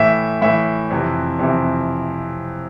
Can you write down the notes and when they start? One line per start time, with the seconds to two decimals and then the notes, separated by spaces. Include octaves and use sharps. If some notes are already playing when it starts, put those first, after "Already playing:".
Already playing: A2 E3 E5
0.42 A2 E3 E5
0.90 F2 C3 E3
1.39 F2 C3 E3